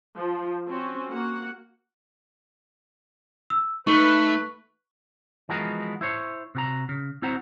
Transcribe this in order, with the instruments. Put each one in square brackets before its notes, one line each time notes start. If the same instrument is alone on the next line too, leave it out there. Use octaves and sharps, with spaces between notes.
[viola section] F3
C4 C#4 F#4
A#3 F#4 F#5
[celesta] E6
[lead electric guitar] A3 [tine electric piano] D#4 [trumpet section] F#4 B4 [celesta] C#6
[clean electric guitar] E3 F3 G#3 B3 F#4 A#4
E4 C5 C#5
C3 F#4 A#5
C#3
C4 E4 F#4 C5 F#5 A#5